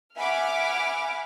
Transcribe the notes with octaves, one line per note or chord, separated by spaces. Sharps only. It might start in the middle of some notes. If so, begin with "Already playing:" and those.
E5 F#5 G#5 B5 D6 F6